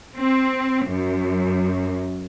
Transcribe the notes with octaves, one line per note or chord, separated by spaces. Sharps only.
C4
F#2